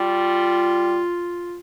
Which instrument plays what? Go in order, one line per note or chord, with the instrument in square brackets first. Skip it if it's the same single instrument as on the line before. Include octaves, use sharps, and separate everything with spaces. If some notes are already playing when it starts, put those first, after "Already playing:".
Already playing: [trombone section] G3 [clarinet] F4